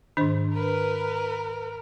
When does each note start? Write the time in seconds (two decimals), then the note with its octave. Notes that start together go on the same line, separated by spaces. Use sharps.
0.17 G#2 D#3 D4 C5
0.55 A#4 B4